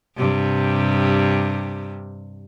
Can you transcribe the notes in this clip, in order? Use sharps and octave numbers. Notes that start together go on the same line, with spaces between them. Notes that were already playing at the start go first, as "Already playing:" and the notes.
G2 C3